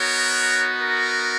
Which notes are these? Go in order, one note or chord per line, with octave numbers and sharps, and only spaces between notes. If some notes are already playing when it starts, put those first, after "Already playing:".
Already playing: B3 D#4 F#4 A#4 C#5
A#4